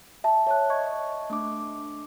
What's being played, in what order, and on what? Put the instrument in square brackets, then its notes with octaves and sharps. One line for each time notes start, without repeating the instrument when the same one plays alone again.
[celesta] E5 A5
[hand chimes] C#5 [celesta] E5 A5 F#6
[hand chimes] D#5 C#6 G#6
A3 D4 D6